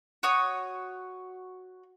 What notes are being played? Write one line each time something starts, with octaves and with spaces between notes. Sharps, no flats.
F#4 C#5 D#6